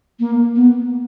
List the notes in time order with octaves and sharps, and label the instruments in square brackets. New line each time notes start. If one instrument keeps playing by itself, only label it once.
[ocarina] A#3
B3